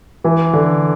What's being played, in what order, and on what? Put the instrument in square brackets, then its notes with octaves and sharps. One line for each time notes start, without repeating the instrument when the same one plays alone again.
[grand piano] E3
D3